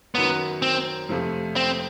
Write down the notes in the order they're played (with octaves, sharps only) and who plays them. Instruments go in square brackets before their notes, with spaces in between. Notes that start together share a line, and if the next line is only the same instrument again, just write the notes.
[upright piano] F#2 D#3 F#3 [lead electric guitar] B3
[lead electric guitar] C4
[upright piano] F2 C3 F3 A3
[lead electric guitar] C4